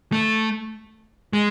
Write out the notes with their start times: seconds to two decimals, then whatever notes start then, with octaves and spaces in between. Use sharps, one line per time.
0.12 A3
1.33 G#3